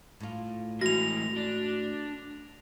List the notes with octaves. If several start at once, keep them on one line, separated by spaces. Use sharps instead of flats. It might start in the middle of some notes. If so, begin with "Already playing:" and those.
A2 F4
G#2 E3 F#4 A#6 F7
D4